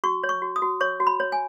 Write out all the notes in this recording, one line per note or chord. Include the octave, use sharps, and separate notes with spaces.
F#4 C#6
C#5
C#6
F#4
D#6
F#4
C#5 C#6
F#4
B5
C#5
G#5